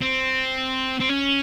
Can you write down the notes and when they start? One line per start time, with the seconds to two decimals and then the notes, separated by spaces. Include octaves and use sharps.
0.02 C4
1.00 C4
1.09 C#4